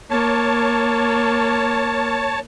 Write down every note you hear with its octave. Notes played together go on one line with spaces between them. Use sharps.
A#3 C#5 A5